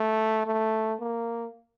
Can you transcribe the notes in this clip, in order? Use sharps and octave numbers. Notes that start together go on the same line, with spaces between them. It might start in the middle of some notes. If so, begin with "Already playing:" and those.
Already playing: A3
A3
A#3